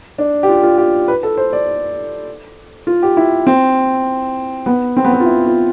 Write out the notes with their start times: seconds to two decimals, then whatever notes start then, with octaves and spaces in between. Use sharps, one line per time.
0.18 D4
0.43 G4
0.48 F4
0.63 F4
0.78 G4
1.08 B4
1.23 A4
1.37 C5
1.53 D5
2.87 F4
3.03 G4
3.17 E4
3.47 C4
4.66 B3
4.97 C4
5.04 B3
5.13 C4
5.20 F4
5.26 E4
5.46 F4